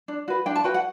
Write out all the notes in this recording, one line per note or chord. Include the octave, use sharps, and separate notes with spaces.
D4
F#4 B4
D4 G5
A5
F#4 B4 G5
F#5